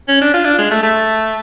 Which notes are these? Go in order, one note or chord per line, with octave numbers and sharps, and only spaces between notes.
C#4
D4
F4
D4
G#3
A3
A3